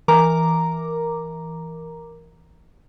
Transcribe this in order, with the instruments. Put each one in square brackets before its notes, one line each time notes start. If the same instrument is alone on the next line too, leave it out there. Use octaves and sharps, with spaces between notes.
[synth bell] E3 A#4 A#5 D6